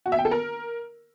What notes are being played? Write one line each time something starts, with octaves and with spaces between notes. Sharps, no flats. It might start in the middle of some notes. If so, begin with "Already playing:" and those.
F#4
E5
G5
A4
A#4